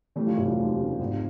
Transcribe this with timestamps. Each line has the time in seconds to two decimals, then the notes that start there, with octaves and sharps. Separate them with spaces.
0.16 E3 G3 A3
0.27 F3 G3
0.37 F1 F#3
0.47 F3 G3
0.58 D#2
0.79 C#3
0.99 G#1